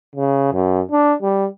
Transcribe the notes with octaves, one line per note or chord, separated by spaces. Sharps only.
C#3
F#2
D4
G3